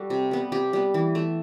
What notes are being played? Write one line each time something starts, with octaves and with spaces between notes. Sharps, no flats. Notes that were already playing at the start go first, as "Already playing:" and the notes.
Already playing: G3 F#4 A4
C3
G3 B3
C3 G4
G3 B3
E3
A3